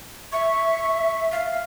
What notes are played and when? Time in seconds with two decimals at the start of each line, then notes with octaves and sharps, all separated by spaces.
0.32 E5 C#6
1.32 F5